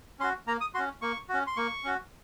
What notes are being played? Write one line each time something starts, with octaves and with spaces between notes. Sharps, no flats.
C#4 F#4 C6
A#3 A#5
D#6
C#4 F#4 C6
A#3 C#6
C#4 F#4
C6
A#3 C#6
C#4 F#4